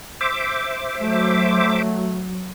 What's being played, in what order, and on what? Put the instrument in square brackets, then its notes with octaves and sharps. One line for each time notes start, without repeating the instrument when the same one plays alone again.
[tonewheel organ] C5 E5 D6
[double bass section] F#3 [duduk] A3